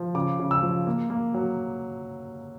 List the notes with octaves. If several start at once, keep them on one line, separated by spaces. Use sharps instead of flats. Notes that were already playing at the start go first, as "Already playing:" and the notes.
Already playing: F3
C#3 D6
C#3
E6
F3
A#3
A#3
F#3